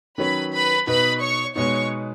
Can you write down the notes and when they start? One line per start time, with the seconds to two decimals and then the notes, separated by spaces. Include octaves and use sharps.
0.18 D#3 F#3 C#4 B4 B5
0.52 B4 B5
0.87 B2 B3 D#4 B4 B5
1.21 C#5 C#6
1.55 B2 G#3 B3 D#4 C#5 C#6